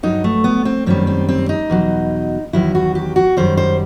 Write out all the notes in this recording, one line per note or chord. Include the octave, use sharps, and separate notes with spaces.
G2 F#3 D#4
A3
B3
C4
F#2 D#3 G3 C4
C4
C4
D#4
E2 B2 F#3
E2 D#3 F#3 E4
F#4
G4
F#4
F#2 D#3 G3 C5
C5